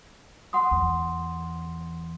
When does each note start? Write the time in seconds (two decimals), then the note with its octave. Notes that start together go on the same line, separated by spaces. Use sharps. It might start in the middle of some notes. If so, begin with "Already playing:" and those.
0.53 F#5 C6 D#6
0.71 E2